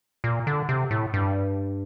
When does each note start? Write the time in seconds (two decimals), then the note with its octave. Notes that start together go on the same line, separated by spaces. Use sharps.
0.24 A#2
0.47 D3
0.69 C3
0.91 A2
1.14 G2